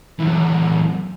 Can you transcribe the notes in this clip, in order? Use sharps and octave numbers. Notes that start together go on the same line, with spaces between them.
F#2 E3